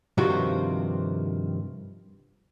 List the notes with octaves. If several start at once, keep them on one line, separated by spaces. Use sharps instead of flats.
G2 C3 D#3 F3 C4 F#4